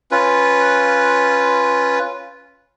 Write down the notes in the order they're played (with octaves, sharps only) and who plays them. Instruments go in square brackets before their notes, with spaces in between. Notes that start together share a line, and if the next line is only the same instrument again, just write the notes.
[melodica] C#4 F4 B4